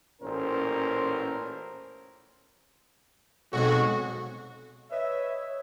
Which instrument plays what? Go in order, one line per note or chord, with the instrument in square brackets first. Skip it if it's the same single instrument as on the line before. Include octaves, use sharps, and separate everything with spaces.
[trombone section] A1 A#2 C#4 A#4 C5
[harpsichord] B1 F2 [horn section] G#3 F#4
[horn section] B4 D#5 E5 [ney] C#5